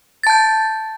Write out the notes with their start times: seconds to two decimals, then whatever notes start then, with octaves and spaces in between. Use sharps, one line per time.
0.23 A6
0.27 A5
0.30 G6